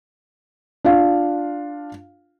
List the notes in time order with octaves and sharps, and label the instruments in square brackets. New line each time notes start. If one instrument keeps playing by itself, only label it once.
[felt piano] D4 F4 F5